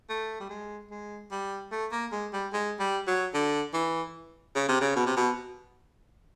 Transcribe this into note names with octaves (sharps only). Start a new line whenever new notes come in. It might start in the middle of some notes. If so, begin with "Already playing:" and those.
A3
G3
G#3
G#3
G3
A3
A#3
G#3
G3
G#3
G3
F#3
D3
E3
C#3
C3
C#3
B2
C3
B2